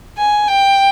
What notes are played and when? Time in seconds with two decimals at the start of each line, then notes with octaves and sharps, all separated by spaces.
0.18 G#5
0.48 G5